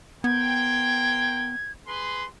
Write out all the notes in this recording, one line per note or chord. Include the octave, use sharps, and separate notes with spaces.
B3 A#4 C5 G5 G#6
G#4 B4 C6